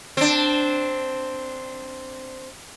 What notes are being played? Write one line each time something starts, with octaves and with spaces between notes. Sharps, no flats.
C4 D4